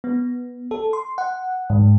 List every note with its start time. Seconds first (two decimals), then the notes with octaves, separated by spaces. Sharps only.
0.04 B3
0.71 A4
0.93 C6
1.18 F#5
1.70 G#2